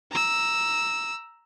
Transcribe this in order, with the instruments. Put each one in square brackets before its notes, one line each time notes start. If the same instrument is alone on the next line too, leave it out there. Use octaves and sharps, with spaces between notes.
[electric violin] A#5 E6